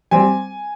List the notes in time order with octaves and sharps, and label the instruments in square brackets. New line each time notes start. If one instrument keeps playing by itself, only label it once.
[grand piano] G3 C4 G#5